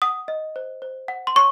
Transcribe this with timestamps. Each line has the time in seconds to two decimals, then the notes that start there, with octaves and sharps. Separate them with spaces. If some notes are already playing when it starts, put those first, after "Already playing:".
0.02 F#5 D#6
0.28 D#5
0.56 C5
0.82 C5
1.08 F#5
1.27 C6
1.36 C#5 C#6